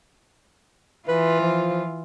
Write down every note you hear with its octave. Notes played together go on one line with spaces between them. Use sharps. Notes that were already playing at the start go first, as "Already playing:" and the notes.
E3 F4 B4
F3